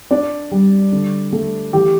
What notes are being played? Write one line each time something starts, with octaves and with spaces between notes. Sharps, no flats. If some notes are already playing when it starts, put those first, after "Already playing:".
D4 D5
G3
D3
A3
E3 G4